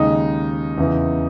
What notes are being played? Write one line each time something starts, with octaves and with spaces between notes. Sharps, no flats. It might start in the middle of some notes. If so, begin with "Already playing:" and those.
Already playing: D#2 C#3 G#3 D#4
E2 C#3 E3